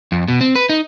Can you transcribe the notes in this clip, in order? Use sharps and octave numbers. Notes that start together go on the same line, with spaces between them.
F2
B2
C4
B4
D#4